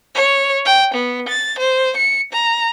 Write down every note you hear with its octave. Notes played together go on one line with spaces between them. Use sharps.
C#5
G5
B3
A6
C5
C#7
A#5